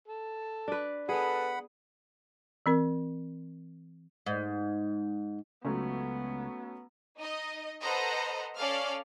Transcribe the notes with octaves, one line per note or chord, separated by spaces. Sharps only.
A4
D4 B4
B3 G#4 A4 B4 F#5 B5
E3 C4 A#4
G#2
C#2 F#3 A3 B3 C#4
D#4 D#5
A4 B4 C5 D#5 F#5 A#5
C#4 A4 D5 F5 F6